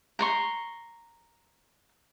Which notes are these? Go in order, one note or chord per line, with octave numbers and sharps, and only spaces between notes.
A#5 C6 C#6